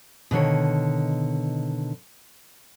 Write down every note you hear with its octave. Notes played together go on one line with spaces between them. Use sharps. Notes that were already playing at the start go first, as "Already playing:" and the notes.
B2 D3 D#3 C#5